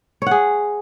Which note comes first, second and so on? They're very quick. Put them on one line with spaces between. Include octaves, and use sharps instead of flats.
C#5 F#5 G#4